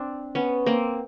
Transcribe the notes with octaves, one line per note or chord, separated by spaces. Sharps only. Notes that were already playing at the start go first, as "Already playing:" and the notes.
Already playing: C4 D4
B3 C#4
A#3 C4